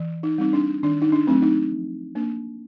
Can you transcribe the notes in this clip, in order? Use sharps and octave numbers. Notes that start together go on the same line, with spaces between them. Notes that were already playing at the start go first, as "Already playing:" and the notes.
Already playing: E3
D#4
G3 C4 D#4
D4
D#3 D4
D#4
D4
F#3 A3 C4
D#4
F3
A#3 D4